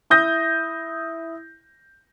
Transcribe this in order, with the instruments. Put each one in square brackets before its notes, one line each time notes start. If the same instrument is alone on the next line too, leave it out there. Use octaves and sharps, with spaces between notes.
[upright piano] E4 D#6 G6 A#6